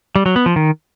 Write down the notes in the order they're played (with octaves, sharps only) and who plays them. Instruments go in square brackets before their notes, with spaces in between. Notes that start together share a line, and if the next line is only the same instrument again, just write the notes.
[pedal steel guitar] G3
F#3
B3
F3
D#3